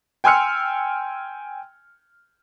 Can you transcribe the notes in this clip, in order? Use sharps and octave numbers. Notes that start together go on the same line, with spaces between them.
G5 G#5 C6 E6 F6 C#7